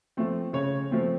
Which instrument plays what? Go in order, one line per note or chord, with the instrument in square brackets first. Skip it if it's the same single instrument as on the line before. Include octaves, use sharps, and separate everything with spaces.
[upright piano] F3 A3 C4
C#3 C#5
F3 A3 C4